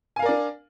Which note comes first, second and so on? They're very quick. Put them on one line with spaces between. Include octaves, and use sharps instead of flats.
G#5 F5 A#4 D5 D4